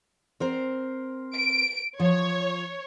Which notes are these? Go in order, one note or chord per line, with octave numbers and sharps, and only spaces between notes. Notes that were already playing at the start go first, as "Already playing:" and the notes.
C4 A#4 C5
D7
F3 C#5